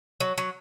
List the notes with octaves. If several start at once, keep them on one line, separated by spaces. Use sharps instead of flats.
F#3
F#3